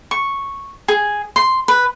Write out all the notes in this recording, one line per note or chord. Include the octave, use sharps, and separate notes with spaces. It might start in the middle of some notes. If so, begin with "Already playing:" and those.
C#6
G#4
C6
B4